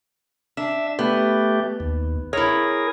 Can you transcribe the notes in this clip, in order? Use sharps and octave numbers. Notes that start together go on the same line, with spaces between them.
D4 E5
A3 B3 G4
D#2
E4 G#4 A#4 C#5